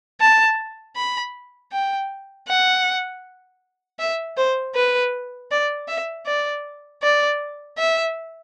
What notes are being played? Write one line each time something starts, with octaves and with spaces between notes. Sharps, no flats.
A5
B5
G5
F#5
E5
C5
B4
D5
E5
D5
D5
E5